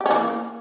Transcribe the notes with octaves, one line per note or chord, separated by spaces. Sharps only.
G4
C#4
E3
A#3